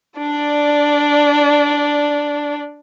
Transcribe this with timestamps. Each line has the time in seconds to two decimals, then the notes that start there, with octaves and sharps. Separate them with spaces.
0.18 D4 D5